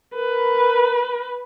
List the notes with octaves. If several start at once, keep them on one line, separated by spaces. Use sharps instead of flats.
A#4 B4